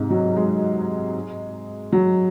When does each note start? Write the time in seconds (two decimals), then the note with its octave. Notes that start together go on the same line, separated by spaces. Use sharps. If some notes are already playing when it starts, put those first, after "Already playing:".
Already playing: G#2 C3
0.10 F#3
0.37 G#3
1.93 F#3